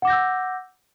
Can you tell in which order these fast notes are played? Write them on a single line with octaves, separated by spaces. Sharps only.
F#5 D6 A#6 G6 E6